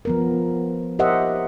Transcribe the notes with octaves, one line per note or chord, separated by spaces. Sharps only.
F3 B3 A#4
G4 A#4 C5 D#5 E5 F#5